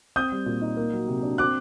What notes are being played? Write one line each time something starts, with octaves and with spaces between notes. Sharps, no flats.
C4 D#6 G6
G3
A#2
D#4
A#3
F#3
C3
D4
C4 D6 F#6